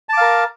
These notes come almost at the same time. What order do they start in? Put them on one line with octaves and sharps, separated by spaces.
A5 D6 F5 A#4